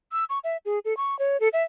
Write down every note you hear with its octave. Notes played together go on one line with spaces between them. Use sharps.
E6
C#6
E5
G#4
A4
C#6
C#5
A4
E5